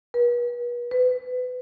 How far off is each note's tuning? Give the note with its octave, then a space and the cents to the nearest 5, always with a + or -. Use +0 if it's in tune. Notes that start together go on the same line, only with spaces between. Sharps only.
B4 -40
B4 +25